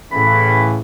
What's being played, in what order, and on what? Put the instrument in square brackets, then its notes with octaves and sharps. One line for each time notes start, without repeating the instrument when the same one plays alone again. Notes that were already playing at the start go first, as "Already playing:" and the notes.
[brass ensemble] A2 C#3 E3 [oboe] B5